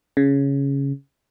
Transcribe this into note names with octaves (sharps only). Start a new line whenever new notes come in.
C#3